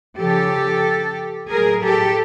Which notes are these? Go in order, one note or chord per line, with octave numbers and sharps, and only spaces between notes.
C#3 F3 G4 A4
A2 F#3 G#4 A#4
G4 A4